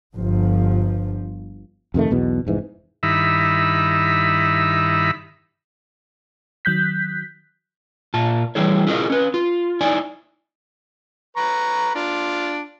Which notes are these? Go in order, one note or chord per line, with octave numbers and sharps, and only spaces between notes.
G1 F3
F2 C3 D#3 A3
B1 E2 B2
F1 G#2 E3
G2 D#3 D#4 E4 E5 B5
D#3 F#3 F#6 G6 B6
A#2 F4 A5
E3 G3 E4 G#4 C#5
E4 F4 G#4 A#4 B4 D#5
C#4 B4
F4
D#4 E4 D5 G#5
B4 A#5 C#6
D4 F4